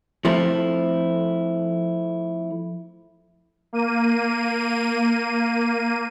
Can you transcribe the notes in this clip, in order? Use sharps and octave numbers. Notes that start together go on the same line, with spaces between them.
F3 A3 C4 E4
A#3 D#7